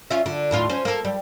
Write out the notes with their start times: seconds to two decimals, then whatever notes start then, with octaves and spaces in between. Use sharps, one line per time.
0.10 C#4 F4 E5
0.26 D3
0.51 D#2 A2 F4
0.69 C#4 C5
0.85 A#3 A4
1.05 G3